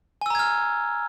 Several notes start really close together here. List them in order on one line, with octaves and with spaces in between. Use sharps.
G#5 E6 A#5 G#6 F6